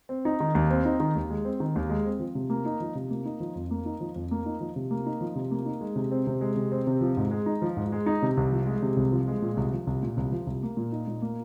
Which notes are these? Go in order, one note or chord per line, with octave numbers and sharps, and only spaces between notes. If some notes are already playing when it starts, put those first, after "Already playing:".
C4
D#4
D#3
D#2
C4
D#4
D#3
D#2
G#3
C4
D#3
D#2
G#3
C4
F3
C3
A#3
D#4
F3
C3
A#3
D#4
F3
F2
A#3
D#4
F3
F2
A#3
D#4
F3
C3
A#3
D#4
F3
C3
A#3
D#4
G#3
C3
C4
C3
G#3
C3
C4
C3
F3
G#2
G#3
D#4
F3
G#2
G#3
D#4
C3
C2
F3
G#3
C3
C2
F3
G#3
A#2
C2
F3
C2
A#2
C2
F3
C2
A#3
A#2
D#4
A#2
A#3